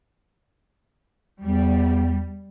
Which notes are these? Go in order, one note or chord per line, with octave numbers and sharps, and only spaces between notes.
E2 G3